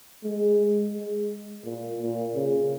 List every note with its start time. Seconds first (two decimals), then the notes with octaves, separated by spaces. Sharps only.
0.24 G#3
0.94 G#3
1.65 A#2
2.00 A#2
2.35 C#3